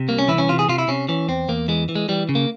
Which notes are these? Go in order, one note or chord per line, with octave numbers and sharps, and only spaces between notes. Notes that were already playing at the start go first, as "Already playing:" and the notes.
Already playing: C3
C2 A#3
C#4
E3 E4
C#4
C3 F4
G#4
C3 F4
E4
C3 C#4
E3 C#4
E2 C4
E2 A#3
E3 G#3
E3
G#3
E3 G3
C#3
A#3